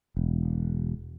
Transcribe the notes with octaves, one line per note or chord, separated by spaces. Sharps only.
E1